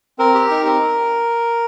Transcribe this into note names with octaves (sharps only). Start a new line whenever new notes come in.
C4 A#4
G4
D#4
C4